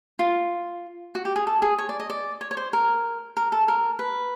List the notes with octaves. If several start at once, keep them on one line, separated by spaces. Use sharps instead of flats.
F4
F#4
G4
G#4
A4
G#4
C#5
D5
D#5
D5
C#5
C#5
C5
A#4
A#4
A4
A#4
B4